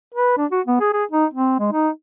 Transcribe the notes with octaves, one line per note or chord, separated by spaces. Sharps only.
B4
D4
F#4
B3
G#4
G#4
D#4
C4
G#3
D#4